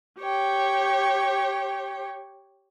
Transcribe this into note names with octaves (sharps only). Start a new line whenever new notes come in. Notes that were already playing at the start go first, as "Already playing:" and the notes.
G4 C#5 G5